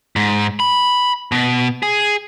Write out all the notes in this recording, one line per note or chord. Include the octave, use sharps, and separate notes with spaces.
G#2
B5
B2
G#4